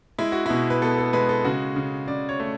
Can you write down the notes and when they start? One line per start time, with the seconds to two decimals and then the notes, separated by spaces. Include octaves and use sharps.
0.19 G#3 E4
0.32 F#4
0.46 B2 E4
0.70 B4
0.82 B3 A4
0.98 A4
1.13 G#3 B4
1.29 A4
1.44 C#3 F#4
1.76 C#3
2.08 C#3 D5
2.29 C#5
2.40 A3